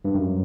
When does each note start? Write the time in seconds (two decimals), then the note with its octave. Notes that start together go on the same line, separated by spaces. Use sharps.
0.05 G2
0.15 F#2